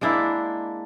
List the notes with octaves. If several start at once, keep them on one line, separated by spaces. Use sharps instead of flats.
G#3 A#3 D4 E4